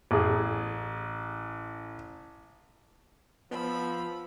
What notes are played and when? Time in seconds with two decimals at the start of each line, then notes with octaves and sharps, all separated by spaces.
0.11 A1 G#4
3.51 F3 B3 B5 E6